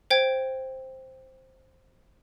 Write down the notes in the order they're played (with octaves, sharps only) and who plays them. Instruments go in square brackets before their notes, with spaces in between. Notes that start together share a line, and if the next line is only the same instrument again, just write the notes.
[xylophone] C5 G5 G#6